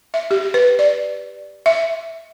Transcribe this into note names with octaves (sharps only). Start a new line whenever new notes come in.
E5
G4
B4
D5
E5